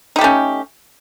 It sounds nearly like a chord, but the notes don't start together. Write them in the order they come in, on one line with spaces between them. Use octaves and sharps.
D#4 G4 A3 C#4